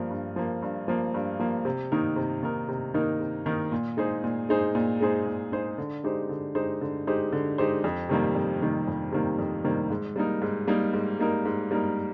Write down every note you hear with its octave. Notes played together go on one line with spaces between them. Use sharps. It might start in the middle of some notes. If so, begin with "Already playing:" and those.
Already playing: G2 F3 A#3
G2
F3 A#3
G2
F3 A#3
G2
F3 A#3
C3
D#3 A#3 D#4 A#4
C3
D#3 A#3 D#4 A#4
C3
D#3 A#3 D#4 A#4
C3
D#3 A#3 D#4 A#4
A#2
G#3 D#4 G#4 C5
A#2
G#3 D#4 G#4 C5
A#2
G#3 D#4 G#4 C5
A#2
G#3 D#4 G#4 C5
D3
G#3 D#4 G4 C5
D3
G#3 D#4 G4 C5
D3
G#3 D#4 G4 C5
D3
G#3 D#4 G4 C5
F2
C3 D#3 G3 A#3
F2
C3 D#3 G3 A#3
F2
C3 D#3 G3 A#3
F2
C3 D#3 G3 A#3
G#2
G3 A#3 D#4 A#4
G#2
G3 A#3 D#4 A#4
G#2
G3 A#3 D#4 A#4
G#2
G3 A#3 D#4 A#4